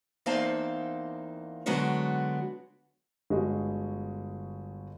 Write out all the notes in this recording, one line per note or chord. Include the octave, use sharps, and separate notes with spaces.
E2 A#3 C4 D#4 F5 A5
D3 F#3 G#3 B3 F#4 C#5
G1 G#3 F#4